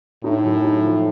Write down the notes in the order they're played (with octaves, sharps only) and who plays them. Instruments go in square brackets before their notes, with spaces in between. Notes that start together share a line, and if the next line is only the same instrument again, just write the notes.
[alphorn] A2 [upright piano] D#4
[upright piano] F#2
D#4
F3